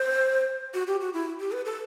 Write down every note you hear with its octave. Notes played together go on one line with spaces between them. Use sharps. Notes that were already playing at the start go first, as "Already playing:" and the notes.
Already playing: C5
F#4
G4
F#4
E4
G4
B4
A4